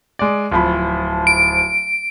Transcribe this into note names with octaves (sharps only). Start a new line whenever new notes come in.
G#3 D5
D1 F3 B5
D7